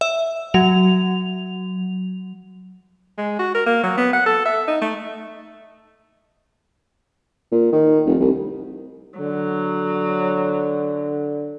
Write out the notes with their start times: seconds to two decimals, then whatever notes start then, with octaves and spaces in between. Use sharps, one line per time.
0.01 E5
0.54 F#3 F7
3.18 G#3
3.39 F#4
3.54 A#4
3.66 A#3
3.83 F#3
3.98 B3
4.13 F#5
4.26 A4
4.45 E5
4.68 D#4
4.81 A3
7.52 A#2
7.72 D#3
8.06 F1
8.20 C2
9.19 D3 F#3